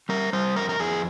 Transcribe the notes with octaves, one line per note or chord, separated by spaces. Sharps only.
G3 A#4
G3 C5
F2 A#4
A#4
F2 G#4